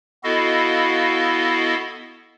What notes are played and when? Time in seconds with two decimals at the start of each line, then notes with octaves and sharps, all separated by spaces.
0.24 B3 E4 F#4 A4 D#5 F5